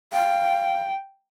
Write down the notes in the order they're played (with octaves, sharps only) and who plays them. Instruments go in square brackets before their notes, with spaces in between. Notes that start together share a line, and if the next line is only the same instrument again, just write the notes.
[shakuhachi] F5 [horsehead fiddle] G5